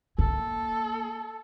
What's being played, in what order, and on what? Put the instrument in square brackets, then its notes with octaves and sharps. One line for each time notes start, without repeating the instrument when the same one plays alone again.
[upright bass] A#3 [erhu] A4